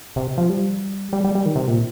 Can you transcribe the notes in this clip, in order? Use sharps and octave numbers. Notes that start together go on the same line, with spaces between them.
C3
F3
G3
G3
G3
G3
D#3
C3
A#2